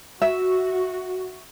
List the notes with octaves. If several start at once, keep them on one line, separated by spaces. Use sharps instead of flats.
F#4 E5